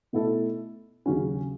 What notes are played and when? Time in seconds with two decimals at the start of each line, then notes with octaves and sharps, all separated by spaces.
0.13 B2 A3 E4 A4
1.06 D#2 C#3 F#3 C#4 F#4